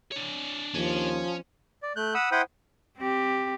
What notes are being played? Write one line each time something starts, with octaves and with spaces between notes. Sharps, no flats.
D4 C#5
D#2 F3 C#4
D5
A3 F#6 G6
F#5 B5 D#6 E6
E4 C5 F#5 G5 B5 D#6
C4 G4